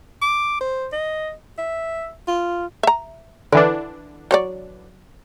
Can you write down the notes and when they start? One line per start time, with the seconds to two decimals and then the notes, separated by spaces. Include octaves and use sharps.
0.22 D6
0.61 C5
0.93 D#5
1.58 E5
2.28 F4
2.83 E5 A#5
3.52 D3 E3 D4 D5
4.31 F#3 C#5 D5